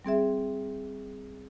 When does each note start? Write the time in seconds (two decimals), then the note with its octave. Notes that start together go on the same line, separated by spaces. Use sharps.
0.05 G3 C4 G#4 E5